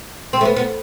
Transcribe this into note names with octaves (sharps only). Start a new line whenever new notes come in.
C4
A3
B3
B3